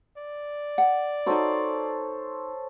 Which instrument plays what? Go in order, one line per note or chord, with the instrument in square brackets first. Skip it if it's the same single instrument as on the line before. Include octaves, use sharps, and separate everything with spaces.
[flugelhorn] D5
[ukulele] F#5
[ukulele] D#4 F#4 [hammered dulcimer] A4 C5 C#5